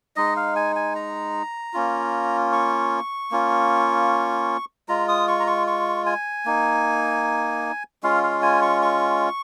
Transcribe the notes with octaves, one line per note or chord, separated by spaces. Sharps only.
G#3 D#4 D#5
F5
G#5
G#5
A#5
A#3 C#4 F4
C#6
A#3 C#4 F4
G#3 F4 A#5
D#6
C#6
A#5
C#6
C#6
G#5
A#3 D#4
G#3 C#4 F4 F5
F5
G#5
C#6
C#6